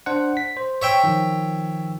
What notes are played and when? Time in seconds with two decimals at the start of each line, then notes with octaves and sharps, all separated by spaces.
0.06 D4 C5 F#5
0.37 B6
0.57 C5
0.82 C#5 E5 G5
1.04 D#3 F3